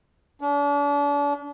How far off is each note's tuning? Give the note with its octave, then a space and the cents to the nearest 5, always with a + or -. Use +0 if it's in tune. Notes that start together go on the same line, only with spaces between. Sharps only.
D4 -40